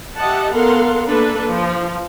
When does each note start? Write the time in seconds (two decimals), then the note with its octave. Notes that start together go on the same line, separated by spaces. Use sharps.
0.18 G4 D#5 E5 F#5 A5
0.52 B3 A4 A#4 F5 F#5 C6
1.06 A3 A#3 D4 A4 B4
1.46 F3